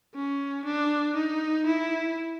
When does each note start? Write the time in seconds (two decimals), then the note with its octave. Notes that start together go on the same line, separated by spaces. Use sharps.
0.14 C#4
0.65 D4
1.15 D#4
1.66 E4